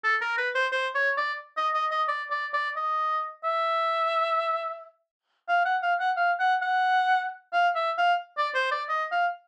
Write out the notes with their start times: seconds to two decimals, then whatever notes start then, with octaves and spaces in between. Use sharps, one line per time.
0.04 A4
0.21 A#4
0.38 B4
0.55 C5
0.72 C5
0.95 C#5
1.18 D5
1.57 D#5
1.74 D#5
1.91 D#5
2.08 D5
2.31 D5
2.54 D5
2.76 D#5
3.44 E5
5.49 F5
5.65 F#5
5.83 F5
6.00 F#5
6.17 F5
6.39 F#5
6.62 F#5
7.53 F5
7.75 E5
7.98 F5
8.38 D5
8.55 C5
8.72 D5
8.89 D#5
9.11 F5